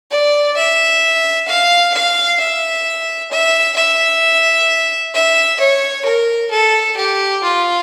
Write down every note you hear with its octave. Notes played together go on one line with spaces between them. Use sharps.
D5
E5
F5
F5
E5
E5
E5
E5
C#5
A#4
A4
G4
F4